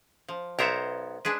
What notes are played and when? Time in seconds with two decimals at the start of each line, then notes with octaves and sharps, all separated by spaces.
0.28 F3
0.59 B1 B3 A#4 C5 C#5 E5
1.25 G#3 D4 G#4 B4